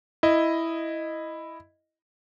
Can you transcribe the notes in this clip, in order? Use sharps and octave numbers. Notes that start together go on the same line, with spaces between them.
E4 D#5